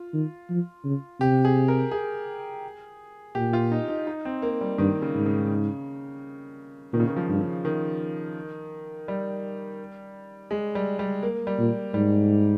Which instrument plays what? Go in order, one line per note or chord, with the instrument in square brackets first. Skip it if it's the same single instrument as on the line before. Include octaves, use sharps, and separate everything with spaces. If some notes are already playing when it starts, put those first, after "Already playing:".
Already playing: [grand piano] F4
[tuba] D#3
F3
C#3
[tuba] C3 [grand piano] G4
[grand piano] G#4
A#4
G#4
[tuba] A#2 [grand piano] G4
[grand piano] F4
D#4
D#4
D#4
C4
A#3
G3
[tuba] G2 [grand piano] D#3
[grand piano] C#3
[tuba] G#2
[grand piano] C#3
[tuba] A#2 [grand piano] D#3
[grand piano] C#3
D#3
F3
[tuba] G2
[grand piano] C#3
D#3
G3
G#3
G3
G3
A#3
G3
[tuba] A#2
[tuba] G#2 [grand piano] G3